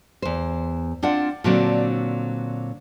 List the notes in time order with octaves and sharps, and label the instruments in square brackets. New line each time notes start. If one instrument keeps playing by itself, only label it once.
[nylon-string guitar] E2 C5
C4 D4 F4 F#5
A#2 D3 F#3 C4 D4